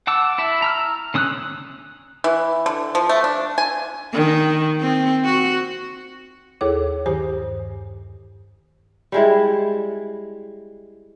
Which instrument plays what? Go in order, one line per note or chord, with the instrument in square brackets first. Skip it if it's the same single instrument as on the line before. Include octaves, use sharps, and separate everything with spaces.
[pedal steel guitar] F#5 A5 D6 E6
E4 E5 A5
A#5 E6 F6
D3 C#4 D#6 E6 F#6
[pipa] E3
D3
F3
A3
D4
G#5
[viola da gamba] D#3
C4
F#4
[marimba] D#2 E4 G#4 A4 C#5 D6
G2 D#3 G4 C5 G#5 D#6
[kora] G3 G#3 E4